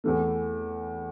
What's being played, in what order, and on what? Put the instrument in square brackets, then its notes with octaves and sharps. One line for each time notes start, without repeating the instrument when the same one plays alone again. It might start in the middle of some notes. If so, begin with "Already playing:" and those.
[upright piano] E2 E3 A3